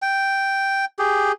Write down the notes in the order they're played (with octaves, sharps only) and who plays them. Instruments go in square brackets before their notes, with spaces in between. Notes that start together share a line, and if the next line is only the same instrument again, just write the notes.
[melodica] G5
G4 G#4